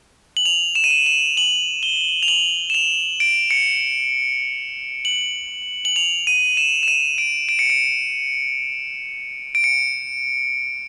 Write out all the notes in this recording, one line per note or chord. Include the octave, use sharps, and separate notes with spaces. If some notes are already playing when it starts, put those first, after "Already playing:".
F#7
F7
E7
D#7
E7
E7
F#7
G7
F7
F#7
E7
F7
D7
C#7
F#7
F#7
F7
D#7
E7
E7
D#7
D7
D7
C#7
D7
D7
C#7